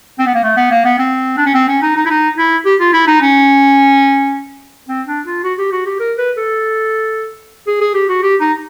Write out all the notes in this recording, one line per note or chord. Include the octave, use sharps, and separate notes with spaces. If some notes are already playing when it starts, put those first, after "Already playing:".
C4
B3
A#3
A3
B3
A#3
B3
C4
D4
C#4
C4
C#4
D#4
D#4
E4
D#4
E4
G4
F4
E4
D#4
C#4
C4
D4
F4
F#4
G4
F#4
G4
A#4
B4
A4
G#4
G#4
G4
F#4
G4
D#4